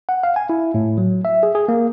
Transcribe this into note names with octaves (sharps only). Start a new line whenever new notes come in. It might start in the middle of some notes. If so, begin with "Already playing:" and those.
F#5
F5
G#5
E4
A2
F#3
E5
G#4
G#4
A#3